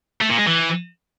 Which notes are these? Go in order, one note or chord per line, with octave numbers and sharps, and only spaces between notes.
A3
A#2
G#3
E3